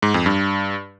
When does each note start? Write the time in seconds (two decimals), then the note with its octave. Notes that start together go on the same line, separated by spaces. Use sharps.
0.02 G#2
0.14 F2
0.26 G2